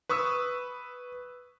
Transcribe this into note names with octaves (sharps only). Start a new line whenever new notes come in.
B4 C#6 D#6 E6